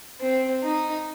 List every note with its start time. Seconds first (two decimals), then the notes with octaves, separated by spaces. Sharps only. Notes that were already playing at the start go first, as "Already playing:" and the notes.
0.20 C4
0.63 D#4